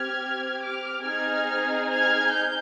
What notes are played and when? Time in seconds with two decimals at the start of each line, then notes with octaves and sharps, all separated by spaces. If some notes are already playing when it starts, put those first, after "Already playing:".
Already playing: C4 G4 F6 G#6
0.62 D6 F6
1.04 C4 D#4 G#4 F6 G#6
1.88 F6 G#6
2.31 G6